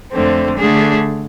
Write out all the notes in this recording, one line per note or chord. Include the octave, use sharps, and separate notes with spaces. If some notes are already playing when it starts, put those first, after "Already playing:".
F2 D3 A3 C4
D3 A3 D4 G#4